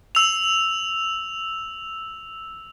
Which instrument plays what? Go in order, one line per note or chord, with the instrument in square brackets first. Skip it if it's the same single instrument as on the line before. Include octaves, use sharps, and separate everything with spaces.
[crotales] E6 F7